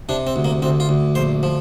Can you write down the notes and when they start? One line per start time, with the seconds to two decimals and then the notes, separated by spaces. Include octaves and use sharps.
0.09 C3 D4
0.27 C4
0.36 D2
0.44 A#3
0.62 D2 C4
0.80 F4
0.89 D2
1.15 A#1 C5
1.43 F3